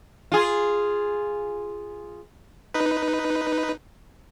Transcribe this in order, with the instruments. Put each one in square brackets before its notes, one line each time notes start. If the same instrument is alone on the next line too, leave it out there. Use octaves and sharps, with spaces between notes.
[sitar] F4 G#4
[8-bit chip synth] D#4 B4